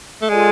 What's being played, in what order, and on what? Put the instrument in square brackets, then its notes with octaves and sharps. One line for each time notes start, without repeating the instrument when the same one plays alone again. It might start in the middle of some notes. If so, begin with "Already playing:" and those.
[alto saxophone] A3
[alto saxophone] G#3 [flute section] F4 A4 D5 G#5